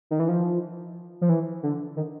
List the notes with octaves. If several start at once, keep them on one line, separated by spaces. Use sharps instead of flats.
D#3
E3
F3
F3
E3
D3
D#3